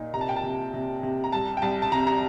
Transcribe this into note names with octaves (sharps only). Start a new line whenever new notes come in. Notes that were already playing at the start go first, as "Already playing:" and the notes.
Already playing: A#2 D#4
C3 A#5
A5
G5
A5
C3
C3
C3
A#5
C2 A5
G5
C2 A5
A5
C3 A#5
A#5